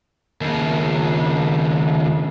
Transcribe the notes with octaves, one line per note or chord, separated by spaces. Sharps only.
D#2 C#3